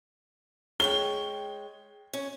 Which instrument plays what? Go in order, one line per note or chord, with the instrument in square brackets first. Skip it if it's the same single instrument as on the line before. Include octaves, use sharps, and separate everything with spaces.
[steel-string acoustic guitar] G#3 C#5 G5 [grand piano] G7
[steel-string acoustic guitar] C#4